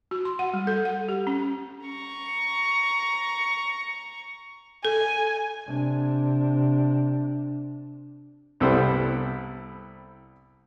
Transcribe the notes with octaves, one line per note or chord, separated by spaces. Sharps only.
F#4
C6
F#5
G3
A4
F#5
G4
C#4
A#5 C#6
A4 G#5
C3 D4
C2 G3 B3 E4 A4 C5